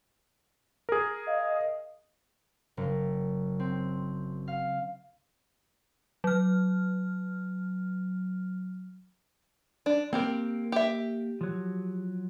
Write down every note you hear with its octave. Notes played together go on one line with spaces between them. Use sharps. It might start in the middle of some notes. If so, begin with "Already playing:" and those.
G#4 A#4
D#5 F5
F#1
C4
F5
F#3 F6
D4
A#3 C4 G4 A#4
G4 E5
F3 F#3